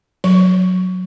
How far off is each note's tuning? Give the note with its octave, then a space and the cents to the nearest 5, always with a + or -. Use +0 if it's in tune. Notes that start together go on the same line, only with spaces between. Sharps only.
F#3 -10 C#6 +20